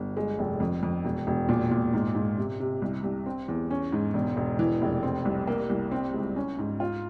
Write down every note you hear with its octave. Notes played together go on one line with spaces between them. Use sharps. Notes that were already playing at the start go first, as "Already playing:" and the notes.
Already playing: G1
G#3
F1
F2
F2
E1
E1
A#2
A#2
G#2
G#2
C3
C3
C2
C2
C4
E2
C#4
G#2
E1
E1
E3
F1
C4
C2
A#3
C2
C4
C#2
C#4
G#2
F4